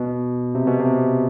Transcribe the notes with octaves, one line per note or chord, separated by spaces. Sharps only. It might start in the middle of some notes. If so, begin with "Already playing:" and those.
Already playing: B2
C3
B2
C3